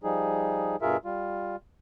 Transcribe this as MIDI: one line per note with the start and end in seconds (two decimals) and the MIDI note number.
0.04 0.76 53
0.04 0.76 55
0.04 0.76 63
0.04 0.76 68
0.82 0.97 43
0.82 0.97 47
0.82 0.97 65
0.82 0.97 68
0.82 0.97 70
0.82 0.97 76
1.05 1.56 55
1.05 1.56 65